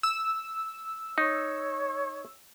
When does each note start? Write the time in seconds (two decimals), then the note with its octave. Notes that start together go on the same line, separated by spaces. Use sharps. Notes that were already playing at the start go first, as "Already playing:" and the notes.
0.03 E6
1.18 D#4 C#5